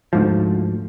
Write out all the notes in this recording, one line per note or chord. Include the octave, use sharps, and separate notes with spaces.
D2 G#2 F3